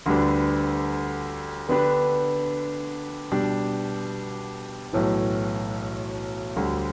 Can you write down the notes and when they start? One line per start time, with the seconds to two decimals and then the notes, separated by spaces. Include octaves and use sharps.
0.06 D2 D3 G3 D4 B4
1.69 D3 B3 D4 G4 B4
3.32 B2 G3 D4
4.93 B1 A2 E3
6.56 D2 D3 G3